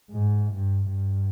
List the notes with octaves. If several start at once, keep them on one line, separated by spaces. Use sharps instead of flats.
G#2
G2
G2